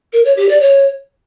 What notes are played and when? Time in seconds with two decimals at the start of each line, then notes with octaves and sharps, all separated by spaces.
0.13 A#4
0.25 C#5
0.37 G4
0.49 D5
0.61 C#5